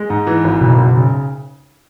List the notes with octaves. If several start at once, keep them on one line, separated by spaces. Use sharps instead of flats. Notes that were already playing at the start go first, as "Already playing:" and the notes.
Already playing: G#3
G#2
E3
G#1
F#1 B2
F#1
C#3